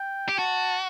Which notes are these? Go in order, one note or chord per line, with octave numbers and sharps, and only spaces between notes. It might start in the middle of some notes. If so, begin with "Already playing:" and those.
Already playing: G5
G4
F#4 A5